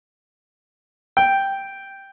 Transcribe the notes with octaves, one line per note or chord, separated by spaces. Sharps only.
G5